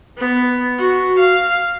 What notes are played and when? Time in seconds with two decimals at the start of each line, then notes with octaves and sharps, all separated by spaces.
0.18 B3
0.78 F#4
1.19 F5